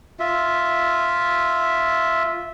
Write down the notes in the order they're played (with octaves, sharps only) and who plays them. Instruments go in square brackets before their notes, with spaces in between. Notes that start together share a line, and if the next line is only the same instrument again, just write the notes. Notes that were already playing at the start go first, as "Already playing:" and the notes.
[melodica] F4 E5